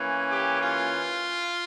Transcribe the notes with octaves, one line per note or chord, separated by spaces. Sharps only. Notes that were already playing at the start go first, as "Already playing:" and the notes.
Already playing: E3 A#3 C#4
G4
F4